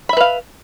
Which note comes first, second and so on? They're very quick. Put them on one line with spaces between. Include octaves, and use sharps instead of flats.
B5 E5 B4 F5